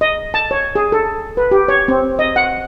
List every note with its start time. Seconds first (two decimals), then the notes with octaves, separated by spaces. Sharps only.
0.01 D#5
0.34 A5
0.51 C#5
0.75 G#4
0.92 A4
1.37 B4
1.51 G4
1.68 C#5
1.88 C4
2.19 D#5
2.36 F#5